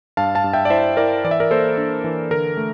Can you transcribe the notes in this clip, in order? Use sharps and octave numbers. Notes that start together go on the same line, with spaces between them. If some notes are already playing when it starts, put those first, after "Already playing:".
G2 F5 A5
F5 A5
G2
E5 G5
D5
E4 C5 E5
E4 A#4 D5
E3 D5
E5
A#4 D5
A#3 A4 C5
D4
E3
D3 A#4
A3